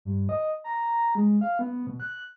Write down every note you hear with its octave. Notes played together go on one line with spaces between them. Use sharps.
G2
D#5
A#5
G#3
F5
B3
B2
F#6